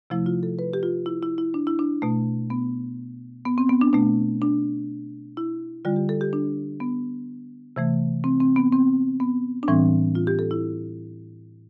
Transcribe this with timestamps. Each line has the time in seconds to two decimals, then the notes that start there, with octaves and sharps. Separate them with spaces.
0.10 C3 F3 A3 E4
0.26 F4
0.43 A4
0.59 B4
0.73 G4
0.83 F4
1.06 E4
1.23 E4
1.38 E4
1.54 D4
1.67 E4
1.79 D4
2.02 B2 A3
2.50 B3
3.45 B3
3.58 C4
3.69 B3
3.81 D4
3.93 B2 A3 D4
4.42 D4
5.37 E4
5.85 D3 G3 F4
5.96 G4
6.09 A4
6.21 G4
6.33 D4
6.80 B3
7.76 C3 E3 A3
8.24 C4
8.40 C4
8.56 B3
8.72 C4
9.20 B3
9.63 D4
9.68 A2 E3 G3 C4
10.15 F4
10.27 G4
10.39 A4
10.51 E4